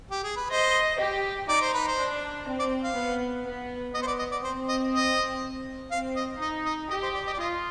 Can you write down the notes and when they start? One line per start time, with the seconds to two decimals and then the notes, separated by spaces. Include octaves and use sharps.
0.11 G4
0.24 G#4
0.37 B4
0.50 C5 D#5
0.99 G4
1.49 D#4 D5
1.61 C5
1.74 B4
1.88 C5
1.98 D4
2.47 C4
2.59 D5
2.84 F5
2.97 B3
3.46 B3
3.94 B3 D#5
4.02 C5
4.07 D5
4.19 D#5
4.32 D5
4.44 C4 C5
4.68 D#5
4.94 D#5
5.91 C4 F5
6.16 D#5
6.41 D#4 D#5
6.66 D#5
6.91 G4 D#5
7.03 C5
7.14 D5
7.27 D#5
7.33 D5
7.40 F4 D#5